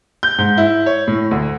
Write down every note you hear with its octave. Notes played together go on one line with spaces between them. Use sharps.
G6
G#2
E4
C#5
A2
D2